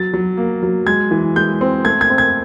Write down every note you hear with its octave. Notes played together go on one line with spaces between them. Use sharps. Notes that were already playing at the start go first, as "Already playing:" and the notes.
Already playing: F#3 A6
F#3
A#3
F#3
G#3 G#6
E3
G#3 G6
C4
A3 G#6
G#6
C4
G#6